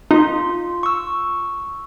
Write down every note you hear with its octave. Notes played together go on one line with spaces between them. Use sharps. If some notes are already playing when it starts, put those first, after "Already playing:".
D#4 F4 C6
C#6 E6